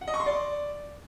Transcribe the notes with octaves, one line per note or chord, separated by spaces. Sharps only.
F#5
D#5
C#6
C6
D5